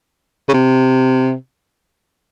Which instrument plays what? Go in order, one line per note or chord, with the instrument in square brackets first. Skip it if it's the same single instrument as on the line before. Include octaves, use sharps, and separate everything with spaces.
[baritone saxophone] C#3
C3